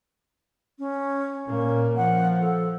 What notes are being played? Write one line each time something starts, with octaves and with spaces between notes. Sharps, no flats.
C#4
A#2 A#3 C#4
F3 F#5
A4